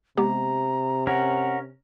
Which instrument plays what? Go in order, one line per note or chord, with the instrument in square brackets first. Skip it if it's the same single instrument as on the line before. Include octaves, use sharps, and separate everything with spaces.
[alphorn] C3 [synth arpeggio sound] G#3 B3 G4 [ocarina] A#5
[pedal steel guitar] C#4 A#4 [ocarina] F#5